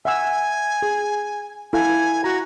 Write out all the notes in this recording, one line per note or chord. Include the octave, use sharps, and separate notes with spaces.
E5 F#5 G#5 E6
G#4
E4 A4 F5 G#5
F#4 A#5